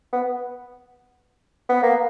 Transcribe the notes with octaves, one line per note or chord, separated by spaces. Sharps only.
B3
B3
A#3